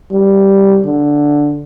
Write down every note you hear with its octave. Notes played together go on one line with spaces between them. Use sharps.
G3
D3